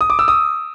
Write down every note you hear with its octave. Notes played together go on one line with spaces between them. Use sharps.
D#6
D6
E6
D#6